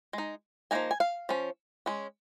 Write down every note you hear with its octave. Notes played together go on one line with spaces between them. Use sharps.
G#3 D#4
F3 A#3 D#4 G#5
G#5
F5
F3 C#4
G#3 C#4